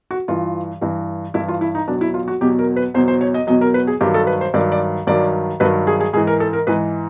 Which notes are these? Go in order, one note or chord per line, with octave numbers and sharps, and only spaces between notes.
F#4
G2 E3 F4
G2 E3
G2 E3 E4
F4
E4
D#4
E2 B2 F#3 D4
E4
F4
F#4
E2 B2 F#3 G4
A#4
B4
E2 B2 F#3 C5
C5
C#5
D#5
E2 B2 F#3 D#5
A#4
B4
G#4
G2 D#3 F#3 G4
A4
B4
C5
G2 D#3 F#3 D5
D5
G2 D#3 F#3 D5
G2 D#3 F#3 B4
G#4
G#4
G#2 E3 G#4
A#4
A4
A#4
G#2 E3 B4